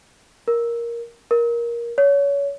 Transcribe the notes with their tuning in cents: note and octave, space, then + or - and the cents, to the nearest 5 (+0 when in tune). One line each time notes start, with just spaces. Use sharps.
A#4 +10
A#4 +15
C#5 +25